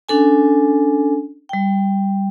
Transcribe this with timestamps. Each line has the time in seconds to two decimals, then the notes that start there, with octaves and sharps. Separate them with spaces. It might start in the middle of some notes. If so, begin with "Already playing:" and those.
0.09 C#4 D4 A4 G#5
1.49 G3 G5